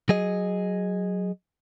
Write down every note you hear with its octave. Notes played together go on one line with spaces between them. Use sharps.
F#3 G#4 D#5